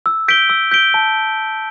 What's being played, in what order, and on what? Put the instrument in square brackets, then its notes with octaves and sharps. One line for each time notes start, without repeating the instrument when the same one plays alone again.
[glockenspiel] E6
G6 B6 D7 G7
E6
G6 B6 D7 G7
A5